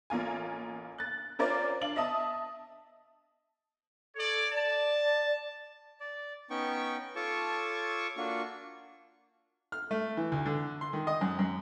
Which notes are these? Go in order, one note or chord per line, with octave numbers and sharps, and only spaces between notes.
A1 A#3 F4 G#5
F#6 A6
C#4 F4 A#4 C5 D5
D4 F5 F#7
D#5 E5 A5 D#6
A4 C#5 D5
D5 A5
D5
B3 C#4 D#4 G5 C#6
F4 A4 C#5 A5 C#6 D6
A#3 D4 F4 F#4 C#6
F6
A3
E3
D2
D3
C6
D#3
D#5
F#2
F#2